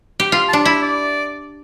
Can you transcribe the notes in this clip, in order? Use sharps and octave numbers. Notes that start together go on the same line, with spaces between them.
G4
F4 F5
A5
D4
E4 B5
D5